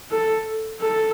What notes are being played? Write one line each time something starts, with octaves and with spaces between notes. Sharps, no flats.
A4
A4